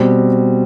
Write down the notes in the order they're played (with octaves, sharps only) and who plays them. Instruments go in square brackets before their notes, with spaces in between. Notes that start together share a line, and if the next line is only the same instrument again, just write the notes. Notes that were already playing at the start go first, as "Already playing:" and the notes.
Already playing: [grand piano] B2 G3 C4